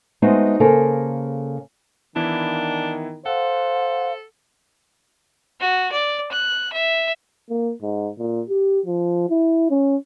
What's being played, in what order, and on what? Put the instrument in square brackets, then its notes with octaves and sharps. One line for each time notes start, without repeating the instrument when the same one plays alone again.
[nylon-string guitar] G#3 A3 B3 C4 D#4 F#4
C#3 A#3 A4 A#4 C5
[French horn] D#3 [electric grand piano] E3 B3 E4 [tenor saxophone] D4
[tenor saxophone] A4 [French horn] C5 [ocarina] F5 [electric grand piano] F#5
[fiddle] F#4
D5
F#6
E5
[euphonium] A#3
G#2
A#2
G4
F3
E4
C#4